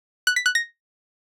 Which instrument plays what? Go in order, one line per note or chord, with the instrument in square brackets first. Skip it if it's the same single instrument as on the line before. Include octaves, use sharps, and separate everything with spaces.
[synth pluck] F#6
B6
F#6
A#6